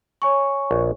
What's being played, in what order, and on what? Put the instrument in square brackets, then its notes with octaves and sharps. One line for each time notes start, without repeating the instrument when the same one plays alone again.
[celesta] C#5 G#5 C#6
[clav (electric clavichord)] A#1